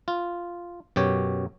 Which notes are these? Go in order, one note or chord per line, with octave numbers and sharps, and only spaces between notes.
F4
F#2 B2 G4 C#5